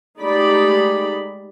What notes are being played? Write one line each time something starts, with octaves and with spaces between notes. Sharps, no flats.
G#3 A3 D#4 G4 D5 B5